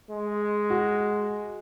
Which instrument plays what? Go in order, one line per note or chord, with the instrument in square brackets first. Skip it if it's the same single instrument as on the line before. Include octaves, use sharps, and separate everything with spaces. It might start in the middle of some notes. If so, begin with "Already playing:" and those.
[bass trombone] G#3
[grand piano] F#4